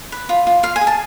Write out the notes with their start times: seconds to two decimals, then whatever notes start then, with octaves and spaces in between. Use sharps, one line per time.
0.12 B4
0.29 F4
0.47 F4
0.63 F4 F5
0.76 G#5
0.81 G#4
0.87 A5